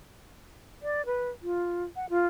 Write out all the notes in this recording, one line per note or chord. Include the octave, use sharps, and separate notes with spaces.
D5
B4
F4
F#5
F4